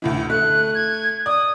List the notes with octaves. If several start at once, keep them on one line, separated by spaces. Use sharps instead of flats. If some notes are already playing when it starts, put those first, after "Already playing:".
D2 A2 E3
A3 F#6
G#6
D5 D#6